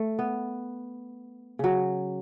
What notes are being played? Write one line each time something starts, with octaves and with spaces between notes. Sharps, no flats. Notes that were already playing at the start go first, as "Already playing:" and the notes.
Already playing: A3
B3
C#3 F#3